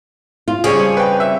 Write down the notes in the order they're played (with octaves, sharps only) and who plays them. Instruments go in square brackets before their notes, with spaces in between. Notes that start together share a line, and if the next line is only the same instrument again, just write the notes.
[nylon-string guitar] F4
[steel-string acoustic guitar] F2 C#4 D5 [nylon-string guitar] C#3 G3 [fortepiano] G#4 C#5
[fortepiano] B4 G5
E5